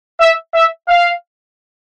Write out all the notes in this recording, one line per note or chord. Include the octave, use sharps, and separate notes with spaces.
E5
E5
F5